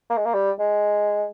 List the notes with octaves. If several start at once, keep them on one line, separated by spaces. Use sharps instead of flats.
A#3
G#3
A#3
G3
G#3